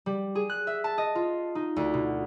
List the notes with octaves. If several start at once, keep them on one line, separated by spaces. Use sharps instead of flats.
G3
G#4
F#6
E5
A5
D#5
F4
D#4
D2
B2